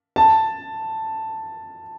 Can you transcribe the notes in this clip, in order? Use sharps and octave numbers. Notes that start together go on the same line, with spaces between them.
A5